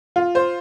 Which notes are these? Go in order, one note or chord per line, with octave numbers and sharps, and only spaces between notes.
F4
C5